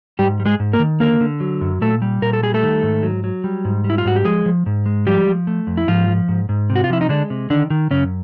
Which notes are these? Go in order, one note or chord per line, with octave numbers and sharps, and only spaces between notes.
G#2 G3 G4
G3
G#3 G#4
G#2
A#3 A#4
D#3
D3 A#3 A#4
D3
F#3
F#2
A#2 A3 A4
G3
A#2 A#4
A4
G3 G#4
A3 A4
D#3
G#2
F#3
F#3
G3
G#2
G3
E4
F4
G#2 F#4
G4
F3 G#3 G#4
F3
G#2
G#3
F3 G3 G4
F3
A3
F2
E4
G#2 F3 F4
F3
G#2
G#2
C3
F#4
F4
F3 E4
D#4
D3 G#3 D4
C3
D3 D#3 D4
D#3
F#2 C#3 C#4